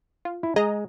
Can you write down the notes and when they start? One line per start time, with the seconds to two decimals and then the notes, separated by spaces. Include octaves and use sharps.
0.25 F4
0.43 E4
0.56 G#3 G#4 D#5 A#5